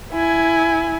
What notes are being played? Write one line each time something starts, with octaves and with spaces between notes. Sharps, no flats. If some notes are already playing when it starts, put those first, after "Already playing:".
E4 G#5